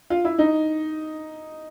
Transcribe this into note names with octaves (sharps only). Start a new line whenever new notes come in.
F4
E4
D#4